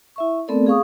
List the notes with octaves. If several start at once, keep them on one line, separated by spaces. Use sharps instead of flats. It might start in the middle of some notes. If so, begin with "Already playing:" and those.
E4 E5 C#6
A3 B3 C4 A4 A#4 D5
G#4 F5 C#6 D#6